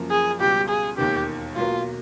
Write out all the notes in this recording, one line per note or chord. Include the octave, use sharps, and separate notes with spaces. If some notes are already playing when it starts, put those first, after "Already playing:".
Already playing: F#2 C#3 F3 A#3
G#4
C#2 B2 G3 G4
G#4
E1 D#2 D#3 G4
B1 B2 F#3 A#3 F4